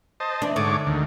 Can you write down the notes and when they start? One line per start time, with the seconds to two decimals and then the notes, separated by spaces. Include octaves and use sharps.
0.20 C5 D#5 A5
0.42 E3 D4
0.56 G#2 D3 C#5 D6
0.87 D2 D#3